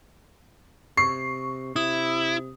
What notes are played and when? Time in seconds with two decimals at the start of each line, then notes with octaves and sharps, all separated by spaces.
0.97 C3 C#6 C7
1.76 C3 E4 D#6